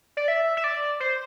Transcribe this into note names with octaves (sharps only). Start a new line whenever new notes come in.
D5
E5
E5
D5
C5